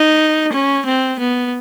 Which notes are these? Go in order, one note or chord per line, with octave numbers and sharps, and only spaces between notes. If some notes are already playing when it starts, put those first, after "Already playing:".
Already playing: D#4
C#4
C4
B3